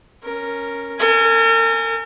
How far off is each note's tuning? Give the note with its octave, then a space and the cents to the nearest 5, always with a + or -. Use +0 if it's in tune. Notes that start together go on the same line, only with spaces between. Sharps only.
C#4 +0 A#4 +0
A#4 -40 G#5 +0